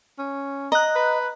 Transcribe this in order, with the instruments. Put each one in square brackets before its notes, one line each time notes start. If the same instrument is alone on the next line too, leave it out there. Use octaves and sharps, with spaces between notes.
[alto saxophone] C#4
[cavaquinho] D#5 [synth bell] A#5 F#6
[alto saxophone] B4